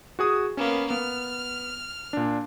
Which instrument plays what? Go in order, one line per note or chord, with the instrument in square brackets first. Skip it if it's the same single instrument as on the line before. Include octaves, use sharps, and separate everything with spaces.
[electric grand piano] F#4 G#4 D#6
[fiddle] A#3 B3 [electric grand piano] C#4
[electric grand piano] B3 [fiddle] F6
[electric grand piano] A#2 D4